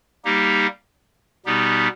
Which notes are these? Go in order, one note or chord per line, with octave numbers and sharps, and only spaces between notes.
G3 A#3 D#4 G4
B2 G3 B3 D#4 G4